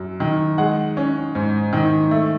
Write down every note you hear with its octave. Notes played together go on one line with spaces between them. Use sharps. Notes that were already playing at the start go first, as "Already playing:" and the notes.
Already playing: F#2
D#3
G#3 F#5
C#4
G#2
D#3
A3